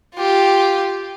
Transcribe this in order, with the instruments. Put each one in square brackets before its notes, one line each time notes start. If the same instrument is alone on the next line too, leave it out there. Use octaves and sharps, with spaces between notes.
[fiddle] F4 G4